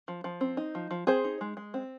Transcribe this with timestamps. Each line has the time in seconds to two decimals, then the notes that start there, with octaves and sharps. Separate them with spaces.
0.08 F3
0.24 F3
0.41 C4
0.57 D#4
0.75 F3
0.91 F3
1.07 C4 G#4 C5
1.24 D#4
1.41 G#3
1.57 G#3
1.74 C4